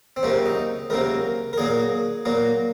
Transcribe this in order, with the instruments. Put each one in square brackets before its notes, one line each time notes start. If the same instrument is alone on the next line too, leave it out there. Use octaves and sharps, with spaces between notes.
[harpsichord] C4
C#2 C3 F#3 A#3 C#4
D#4
C#2 C3 F#3 A#3 A#4
A#4
A#2 F#3 A#3 G#4
A#2 F#3 A#3